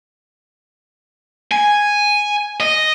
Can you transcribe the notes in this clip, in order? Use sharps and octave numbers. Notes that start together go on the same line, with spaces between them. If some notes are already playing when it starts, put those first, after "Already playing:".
G#5
D#5